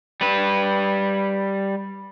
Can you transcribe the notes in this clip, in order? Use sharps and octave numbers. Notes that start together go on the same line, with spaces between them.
G3 B4